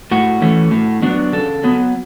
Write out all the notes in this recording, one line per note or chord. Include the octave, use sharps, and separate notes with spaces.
A2 F#4
E3 A3 C#4
A2
F#3 B3 D4
C#3 A4
F#3 B3